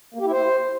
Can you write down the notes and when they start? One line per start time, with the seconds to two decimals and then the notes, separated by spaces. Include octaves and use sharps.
0.14 A#3
0.20 G4
0.26 E4
0.32 C5